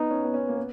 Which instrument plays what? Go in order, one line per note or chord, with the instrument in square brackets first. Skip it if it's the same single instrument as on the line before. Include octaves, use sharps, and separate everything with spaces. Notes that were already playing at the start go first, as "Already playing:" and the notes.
Already playing: [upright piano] B3 [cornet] D#4
[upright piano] C#4
B3
C#4
A#3
B3